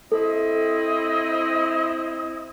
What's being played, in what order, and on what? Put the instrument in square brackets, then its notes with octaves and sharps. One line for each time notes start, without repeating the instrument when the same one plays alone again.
[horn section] C4 E4 D#5 [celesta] A4